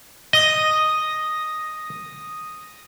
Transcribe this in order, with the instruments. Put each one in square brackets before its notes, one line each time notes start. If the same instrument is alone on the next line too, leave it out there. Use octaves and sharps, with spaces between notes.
[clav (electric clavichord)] D#5 [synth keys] D#6 A#6